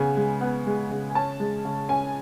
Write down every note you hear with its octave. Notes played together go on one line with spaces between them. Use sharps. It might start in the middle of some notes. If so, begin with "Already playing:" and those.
Already playing: C#3 B3 G#5
G#3
B3
G#3
C#3
G#5
C#4 A5
G#3
C#3
C#4 G#5